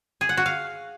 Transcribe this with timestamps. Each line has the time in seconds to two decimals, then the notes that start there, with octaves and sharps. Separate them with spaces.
0.21 G#4
0.29 F#5
0.37 F#4
0.46 F5